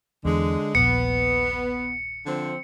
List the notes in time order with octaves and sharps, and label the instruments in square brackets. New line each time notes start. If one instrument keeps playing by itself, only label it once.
[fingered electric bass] E2 [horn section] D3 G#3
[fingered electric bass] D#1 A#1 [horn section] B3 [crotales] C#7
[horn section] D3 F3 C4